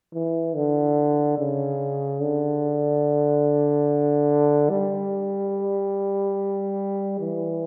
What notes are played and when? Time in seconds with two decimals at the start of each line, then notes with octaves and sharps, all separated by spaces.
0.14 E3
0.56 D3
1.38 C#3
2.22 D3
4.70 G3
7.19 E3